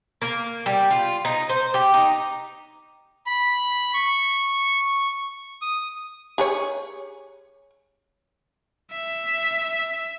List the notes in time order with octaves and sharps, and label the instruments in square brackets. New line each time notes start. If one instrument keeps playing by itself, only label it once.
[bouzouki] A#3
G3
F4
D#4
C5
G4
D#4
[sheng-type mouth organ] B5
C#6
D#6
[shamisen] G4 G#4 C#5
[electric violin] E5